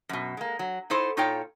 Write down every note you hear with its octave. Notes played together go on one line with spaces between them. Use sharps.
F#2 B2
G#3 A#3
F#3
D#4 E4 A4 C5
A#2 D#4 F4 A4 C#5 G5